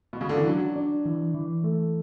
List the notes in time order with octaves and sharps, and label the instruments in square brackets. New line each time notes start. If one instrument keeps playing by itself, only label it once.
[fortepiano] B2
C#3
D3
E3
[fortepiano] F#3 [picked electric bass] D4
[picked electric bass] D4
E3
E3
A3